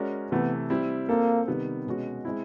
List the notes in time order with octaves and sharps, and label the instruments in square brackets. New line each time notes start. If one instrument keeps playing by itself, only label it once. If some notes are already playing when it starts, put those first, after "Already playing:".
Already playing: [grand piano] G#3 C#4 F#4 A#4 D5
[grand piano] C3 E3 A3 [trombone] B3
[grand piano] G3 C4 E4
[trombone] A#3 [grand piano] C4 F4 A4
[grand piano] C3 D#3 G3 B3
B2 G#3 C#4 F#4
G#3 C4 E4